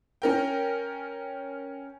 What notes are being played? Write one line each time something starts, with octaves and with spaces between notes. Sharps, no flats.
C#4 A#4 G5